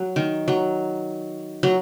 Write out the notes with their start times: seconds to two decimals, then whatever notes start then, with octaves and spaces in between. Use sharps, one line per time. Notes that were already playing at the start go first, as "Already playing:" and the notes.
Already playing: F#3
0.16 D#3
0.48 F#3
1.63 F#3